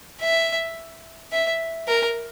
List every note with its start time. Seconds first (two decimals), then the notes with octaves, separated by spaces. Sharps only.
0.21 E5
1.32 E5
1.88 A#4